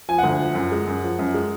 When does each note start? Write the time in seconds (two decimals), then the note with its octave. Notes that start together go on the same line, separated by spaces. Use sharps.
0.09 F3 G#5
0.18 F#5
0.24 D2
0.39 F3
0.55 F#2
0.72 G#3
0.87 F#2
1.03 F3
1.19 F#2
1.34 G#3